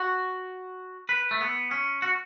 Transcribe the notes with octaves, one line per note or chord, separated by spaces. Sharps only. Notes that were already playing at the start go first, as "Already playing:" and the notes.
Already playing: F#4
B4
A3
B3
C#4
F#4